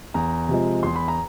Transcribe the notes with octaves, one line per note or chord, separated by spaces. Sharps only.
E2 A#5
C3 F3 G#3
E2 C6
B5
A#5